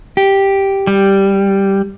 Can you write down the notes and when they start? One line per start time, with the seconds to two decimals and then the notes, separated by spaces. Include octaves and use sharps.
0.17 G4
0.87 G3